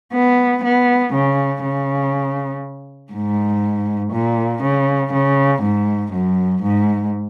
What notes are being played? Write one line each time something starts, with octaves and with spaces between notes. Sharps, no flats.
B3
B3
C#3
C#3
G#2
A#2
C#3
C#3
G#2
F#2
G#2